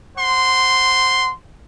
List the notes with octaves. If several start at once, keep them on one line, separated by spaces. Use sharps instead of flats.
C5 F#5 C6